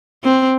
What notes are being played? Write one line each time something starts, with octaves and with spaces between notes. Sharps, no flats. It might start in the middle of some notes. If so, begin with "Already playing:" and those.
C4